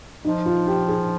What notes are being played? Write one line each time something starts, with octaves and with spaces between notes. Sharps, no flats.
F3 D#4
F4
G4
G#4